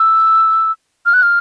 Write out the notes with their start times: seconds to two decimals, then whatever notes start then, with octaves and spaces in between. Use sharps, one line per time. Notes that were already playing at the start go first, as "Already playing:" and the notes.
Already playing: E6
1.06 F6
1.14 F#6
1.23 F6